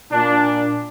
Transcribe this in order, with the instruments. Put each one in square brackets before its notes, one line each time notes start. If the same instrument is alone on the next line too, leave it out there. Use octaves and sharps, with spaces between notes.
[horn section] A#2 D4